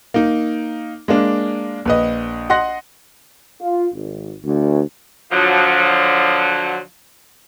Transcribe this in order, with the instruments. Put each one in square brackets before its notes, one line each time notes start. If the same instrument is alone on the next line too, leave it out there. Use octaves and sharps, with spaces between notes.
[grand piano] A#3 D#4
G#3 A#3 D4
A#1 B4 D#5
D#5 F#5 C6 F#6 A#6
[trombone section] F4
G#1
D2
[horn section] D3 F3 F#3